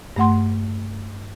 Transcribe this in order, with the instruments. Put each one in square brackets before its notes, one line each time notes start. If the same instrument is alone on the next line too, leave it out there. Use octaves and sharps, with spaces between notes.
[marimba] G2 A3 F#5 C6